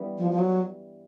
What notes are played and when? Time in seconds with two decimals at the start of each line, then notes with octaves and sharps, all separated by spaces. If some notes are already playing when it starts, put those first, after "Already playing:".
Already playing: G2 E3 G3 B3
0.18 F3
0.31 F3
0.39 F#3